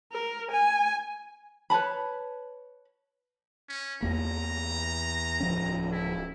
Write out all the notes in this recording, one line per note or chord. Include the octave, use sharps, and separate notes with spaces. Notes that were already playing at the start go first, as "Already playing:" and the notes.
A#4
G#5
B4 C#5 A5 B5
C#4
E2 A#3 A#5
D1 F3 C#4
E4